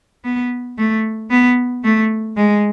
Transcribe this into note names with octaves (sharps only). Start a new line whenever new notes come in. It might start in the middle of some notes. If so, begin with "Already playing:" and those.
B3
A3
B3
A3
G#3